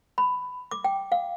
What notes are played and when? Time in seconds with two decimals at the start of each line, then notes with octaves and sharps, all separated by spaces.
0.18 B5
0.71 D6
0.84 G5
1.12 F5